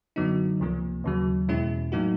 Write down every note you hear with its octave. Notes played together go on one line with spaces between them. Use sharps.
F#2 D3 F#3 B3 D#4
C#2 C3 F3 A#3
D#2 C#3 F#3
E2 B2 G#3 C#4 E4
A2 F#3 A#3 D#4 F#4